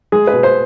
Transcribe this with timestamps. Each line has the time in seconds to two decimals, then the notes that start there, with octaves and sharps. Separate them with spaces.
0.12 G#3 G#4
0.27 B4
0.33 B2
0.43 C5